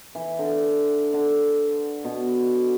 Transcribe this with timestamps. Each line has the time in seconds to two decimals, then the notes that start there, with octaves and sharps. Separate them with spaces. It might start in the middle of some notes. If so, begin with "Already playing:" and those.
0.15 E3
0.39 D3
1.14 D3
2.04 B2